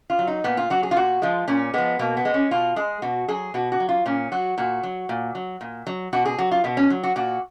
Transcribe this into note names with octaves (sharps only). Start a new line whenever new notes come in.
F4
F#3
D#4
A#2 B3
F4
F#3 F#4
G#4
F4
A#2 F#4
F3 G#3 F4
A#2 C#4
F3 G#3 B3
B2 A#3
B3
G#3
C#4
B2 F4
G#3 G#4
B2 F#4
F#3 G#4
B2 F#4
F#4
F#3
F4
A#2 C#4
F#3 F#4
A#2 F#4
F#3
A#2
F#3
A#2
F#3
B2 F#4
G#4
F#3 F#4
F4
B2 B3
C#4
F#3
F#4
A#2 F#4